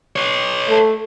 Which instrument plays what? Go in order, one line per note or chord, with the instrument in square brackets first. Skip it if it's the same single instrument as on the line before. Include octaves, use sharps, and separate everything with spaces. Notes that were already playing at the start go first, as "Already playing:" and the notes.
[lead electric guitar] B4 C#5
[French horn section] A3